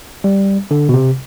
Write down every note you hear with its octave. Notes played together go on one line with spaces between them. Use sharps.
G3
D3
B2
C3